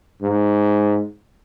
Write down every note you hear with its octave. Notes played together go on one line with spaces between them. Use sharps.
G#2